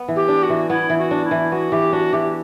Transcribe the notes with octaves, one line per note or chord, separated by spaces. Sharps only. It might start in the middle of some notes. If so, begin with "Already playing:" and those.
Already playing: B3
E3
G4
D4
F#4
E3
B3 E4
E3
F#4
D4
E4
E3
B3 F#4
E3 G4
D4 F#4
E3 G4